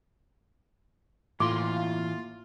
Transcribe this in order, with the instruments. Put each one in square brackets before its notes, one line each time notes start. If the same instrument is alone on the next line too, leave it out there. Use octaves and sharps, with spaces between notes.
[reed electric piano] A2 [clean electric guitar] E3 A#3 C6 [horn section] F4 [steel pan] D6